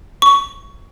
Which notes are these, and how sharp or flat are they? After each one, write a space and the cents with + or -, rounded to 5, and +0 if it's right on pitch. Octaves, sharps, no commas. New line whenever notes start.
C#6 +15